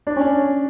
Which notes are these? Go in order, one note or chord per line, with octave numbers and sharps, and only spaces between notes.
D4
C#4